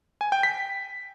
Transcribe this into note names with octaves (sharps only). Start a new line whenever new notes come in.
G#5
G5
B6